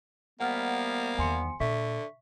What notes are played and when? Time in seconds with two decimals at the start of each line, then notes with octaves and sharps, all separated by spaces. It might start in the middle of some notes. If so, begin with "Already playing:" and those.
0.40 C3 G3 A#3 B3 F#5 F6
1.18 E2 D#3 G#5 C6 C#7
1.60 A#2 D3 E5 C#6 B6